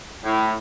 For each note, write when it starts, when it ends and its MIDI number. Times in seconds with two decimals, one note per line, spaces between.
0.24 0.52 45